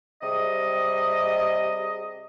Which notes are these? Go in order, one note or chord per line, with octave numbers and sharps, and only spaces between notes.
C3 G3 G#4 D#5